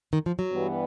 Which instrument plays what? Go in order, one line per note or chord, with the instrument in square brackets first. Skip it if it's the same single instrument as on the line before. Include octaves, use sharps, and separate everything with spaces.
[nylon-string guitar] D#3
F3
F#3
[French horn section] G2 E3 G3 B3